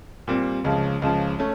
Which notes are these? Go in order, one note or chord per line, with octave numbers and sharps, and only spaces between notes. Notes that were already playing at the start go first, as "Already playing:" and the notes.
A#2 G3 C4
C#2 C#3 F3
C#2 C#3 F3
A3 C#4